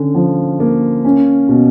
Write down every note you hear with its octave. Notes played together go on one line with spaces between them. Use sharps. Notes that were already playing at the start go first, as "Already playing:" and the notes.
Already playing: D3 C#4
F3
A#3
C#4
B2